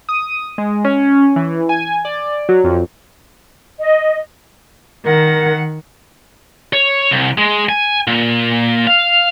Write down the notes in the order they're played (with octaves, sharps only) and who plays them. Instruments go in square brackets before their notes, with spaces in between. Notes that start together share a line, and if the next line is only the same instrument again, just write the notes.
[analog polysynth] D#6
G#3
C#4
E3
G#5
D5
F#3
F2
[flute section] D#5
[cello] D#3 F#5 [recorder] A#4
[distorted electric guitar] C#5
C2
G#3
G#5
A#2
F5